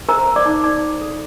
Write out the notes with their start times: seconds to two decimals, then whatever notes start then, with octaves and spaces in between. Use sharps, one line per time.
0.09 A#4 C5 A#5
0.28 C5
0.36 D5 D6
0.46 D#4
0.64 D#4 D5 D6
0.82 C5
1.01 A4